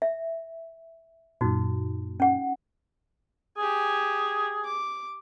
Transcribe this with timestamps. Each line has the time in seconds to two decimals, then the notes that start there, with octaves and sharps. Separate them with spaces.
0.02 E5
1.41 F#2 A#2 D#4 F#4
2.20 C#4 F#5
3.57 G4 G#4 G#5
4.65 D6